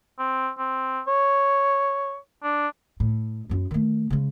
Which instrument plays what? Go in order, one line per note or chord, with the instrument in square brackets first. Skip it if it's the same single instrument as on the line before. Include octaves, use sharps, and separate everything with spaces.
[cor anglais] C4
C4
C#5
D4
[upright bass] A2
F#2 D#4
D#3 A3
C#3 G#3